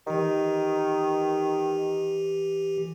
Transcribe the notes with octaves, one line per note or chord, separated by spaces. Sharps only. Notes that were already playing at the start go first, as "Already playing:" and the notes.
D#3 E3 G4